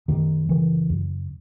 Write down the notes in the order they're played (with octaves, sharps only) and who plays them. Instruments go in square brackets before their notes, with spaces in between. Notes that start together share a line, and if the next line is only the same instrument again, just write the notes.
[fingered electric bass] F#2 D#3
C#3 E3
F#2